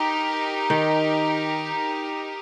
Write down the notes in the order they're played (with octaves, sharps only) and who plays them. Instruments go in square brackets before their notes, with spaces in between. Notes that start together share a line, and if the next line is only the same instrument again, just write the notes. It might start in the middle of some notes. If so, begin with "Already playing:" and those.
Already playing: [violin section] D#4 G4 A#4
[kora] D#3